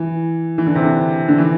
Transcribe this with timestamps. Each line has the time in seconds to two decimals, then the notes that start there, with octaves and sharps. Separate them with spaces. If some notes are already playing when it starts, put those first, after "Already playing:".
Already playing: E3
0.58 E3
0.67 D3
0.75 C3
0.83 D3
1.28 D3
1.38 E3